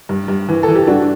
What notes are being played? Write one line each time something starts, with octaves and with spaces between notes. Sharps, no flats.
G2
G2
E3
A4
E3
G4
G2 D4 F#4